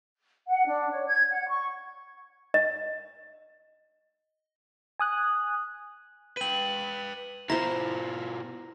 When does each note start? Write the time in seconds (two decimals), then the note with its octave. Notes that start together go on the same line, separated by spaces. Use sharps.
0.46 F#5
0.65 D4
0.91 C#5
1.08 G#6
1.31 F#5
1.47 C#6
2.54 D#5
4.99 G#5 D#6 F#6
6.37 B4 G5 D#7 F#7
7.50 B2 E4 F4 C5 A#5 A#6